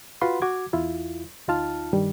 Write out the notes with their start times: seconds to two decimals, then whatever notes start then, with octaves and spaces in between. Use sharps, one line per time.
0.21 F4 F#4 B4 F#5 B5 C6
0.42 F#4 D6 G#6
0.73 E2 E4 F4
1.48 D2 D#4 F4 A5 F6
1.93 G2 D#3 G3